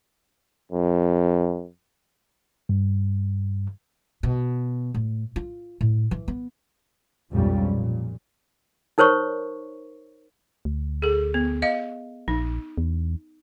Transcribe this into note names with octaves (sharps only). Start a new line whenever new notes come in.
F2
G2
B2
A2
F4
A2
E3
B3
B1 F2 G#2 F3 G3 C#4
A#2
D#4 A#4 C5 C#5 C#6
D2
G#4 A4
B3
D#5 F5
A#1 D#4
E2